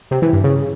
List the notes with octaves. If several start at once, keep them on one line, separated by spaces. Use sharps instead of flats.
C3
E3
G2
C#3